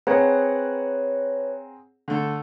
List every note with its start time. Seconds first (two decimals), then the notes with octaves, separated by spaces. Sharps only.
0.07 C4 G#4 B4 C#5 F#5 A#5
2.08 D3 A3